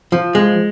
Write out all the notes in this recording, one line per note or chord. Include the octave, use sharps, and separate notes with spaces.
F3
G#3